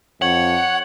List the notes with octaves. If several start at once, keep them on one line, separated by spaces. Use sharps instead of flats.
F2 C#5 F#5 F#7